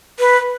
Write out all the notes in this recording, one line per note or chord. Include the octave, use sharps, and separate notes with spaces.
B4